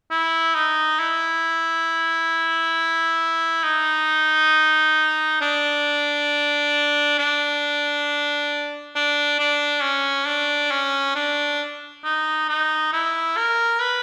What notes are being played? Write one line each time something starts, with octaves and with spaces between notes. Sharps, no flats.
E4
D#4
E4
D#4
D4
D4
D4
D4
C#4
D4
C#4
D4
D#4
D#4
E4
A#4
B4